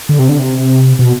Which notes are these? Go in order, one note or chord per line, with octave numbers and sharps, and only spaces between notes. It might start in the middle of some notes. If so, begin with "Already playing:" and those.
D3
C3
D3
C3
B2